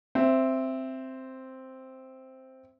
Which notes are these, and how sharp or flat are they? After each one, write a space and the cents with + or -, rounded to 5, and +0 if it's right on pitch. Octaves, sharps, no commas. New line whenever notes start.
C4 +0 E5 +10